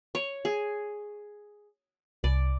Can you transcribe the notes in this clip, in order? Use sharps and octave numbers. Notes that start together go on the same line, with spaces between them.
C#5
G#4
C2 D5